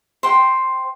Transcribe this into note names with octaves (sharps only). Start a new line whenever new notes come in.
C5 G5